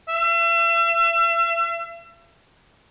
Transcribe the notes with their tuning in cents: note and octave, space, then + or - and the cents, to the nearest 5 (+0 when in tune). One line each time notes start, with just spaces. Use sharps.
E5 +40